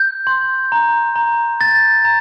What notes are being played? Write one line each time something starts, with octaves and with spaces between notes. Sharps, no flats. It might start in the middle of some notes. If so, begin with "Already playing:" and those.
Already playing: G6
C6
A#5
A#5
G6 A6
A#5